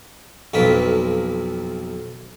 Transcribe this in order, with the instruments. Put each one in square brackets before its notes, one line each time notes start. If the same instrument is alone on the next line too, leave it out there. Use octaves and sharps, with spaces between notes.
[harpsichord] B1 F2 A#3 F4 B4